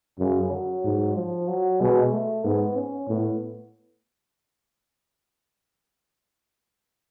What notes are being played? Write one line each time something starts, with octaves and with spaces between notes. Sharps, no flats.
F#2 C#3
F#3
G#2
F3
F#3
B2 G#3
A3
G#2 B3
C#4
A2 B3